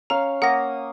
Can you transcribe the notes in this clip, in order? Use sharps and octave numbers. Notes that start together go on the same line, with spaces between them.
C#4 F5 A#5
A#3 F#5 D#6 A#6